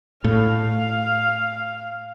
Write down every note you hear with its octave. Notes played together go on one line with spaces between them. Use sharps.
A2 F5